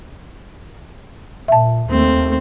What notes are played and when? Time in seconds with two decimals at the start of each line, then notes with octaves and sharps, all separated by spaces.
1.48 A#2 E5 A5
1.90 D#2 A3 C4